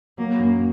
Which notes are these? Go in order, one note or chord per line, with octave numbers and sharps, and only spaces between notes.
F#3 A#3
F#2